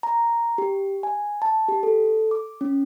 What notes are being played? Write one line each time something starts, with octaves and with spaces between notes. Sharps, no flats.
A#5
G4
G#5
A5
G4
A4
D6
C#4